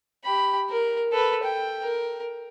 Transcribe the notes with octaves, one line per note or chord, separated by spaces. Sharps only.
G4 B5
A#4
A4 B4
G5
A#4